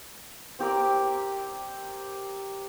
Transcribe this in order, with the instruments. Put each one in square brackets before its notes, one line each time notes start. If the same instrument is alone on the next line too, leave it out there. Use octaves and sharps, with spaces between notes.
[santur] C4 G4 A#4 D5